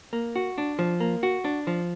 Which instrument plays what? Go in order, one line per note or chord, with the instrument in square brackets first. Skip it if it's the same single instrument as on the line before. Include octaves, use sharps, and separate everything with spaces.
[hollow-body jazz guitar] A#3
F#4
D4
F3
A#3
F#4
D4
F3